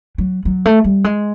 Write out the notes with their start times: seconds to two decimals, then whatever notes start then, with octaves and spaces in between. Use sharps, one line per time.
0.18 F#3
0.45 F#3
0.65 A3
0.84 G3
1.04 G#3